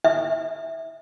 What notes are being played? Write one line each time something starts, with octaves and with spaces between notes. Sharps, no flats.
E5